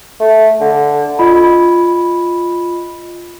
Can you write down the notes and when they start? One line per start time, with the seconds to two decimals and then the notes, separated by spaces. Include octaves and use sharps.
0.20 A3
0.61 D3
1.19 F4 D#5 B5